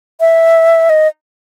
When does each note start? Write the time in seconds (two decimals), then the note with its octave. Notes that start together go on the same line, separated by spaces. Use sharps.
0.20 E5
0.89 D#5